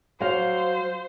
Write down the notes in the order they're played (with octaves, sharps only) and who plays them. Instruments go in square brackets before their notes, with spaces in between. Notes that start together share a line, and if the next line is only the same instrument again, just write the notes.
[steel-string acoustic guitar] F#3 F5 [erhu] C5